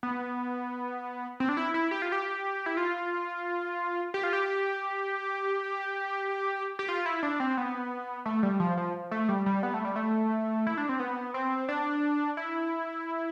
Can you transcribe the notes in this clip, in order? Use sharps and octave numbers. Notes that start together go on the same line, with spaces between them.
B3
C4
D4
E4
E4
G4
F4
G4
E4
F4
G4
F4
G4
G4
F4
E4
D4
C4
B3
A3
G3
F3
F3
A3
G3
G3
B3
A3
G3
A3
E4
D4
C4
B3
C4
D4
E4